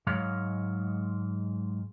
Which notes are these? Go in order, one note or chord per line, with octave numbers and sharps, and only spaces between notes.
G#2 F#3 G#3 C#5 F5